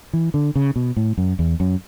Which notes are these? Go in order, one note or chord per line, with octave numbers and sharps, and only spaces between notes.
E3
D3
C#3
B2
A2
F#2
E2
F#2